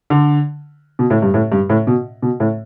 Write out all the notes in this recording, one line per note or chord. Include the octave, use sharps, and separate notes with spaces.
D3
B2
A2
G2
A2
G2
A2
B2
B2
A2